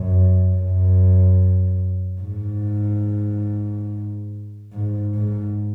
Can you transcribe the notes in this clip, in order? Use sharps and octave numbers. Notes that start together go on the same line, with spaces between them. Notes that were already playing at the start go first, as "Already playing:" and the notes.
Already playing: F#2
F#2
G#2
G#2
G#2